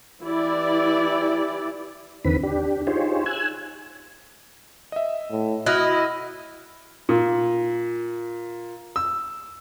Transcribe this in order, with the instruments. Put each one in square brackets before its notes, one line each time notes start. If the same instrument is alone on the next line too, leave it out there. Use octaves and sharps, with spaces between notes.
[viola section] E3 E4 G4 D5
[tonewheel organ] E2 D3 D#3 C4 B4 B5
D4 G4
D#4 F4 G4 G#4 C5 C#5
G#5 E6 F#6 G#6
[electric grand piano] D#5 E5
[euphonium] A2
[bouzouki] E4 [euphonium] F#4 [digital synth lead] D#5 [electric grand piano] F6 F#6
[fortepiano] A#2
E6